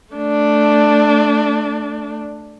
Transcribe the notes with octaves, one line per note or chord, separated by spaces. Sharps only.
A3 D4